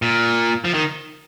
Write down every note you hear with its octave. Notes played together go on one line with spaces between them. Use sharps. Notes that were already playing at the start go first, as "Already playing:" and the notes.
A#2
F3
D#3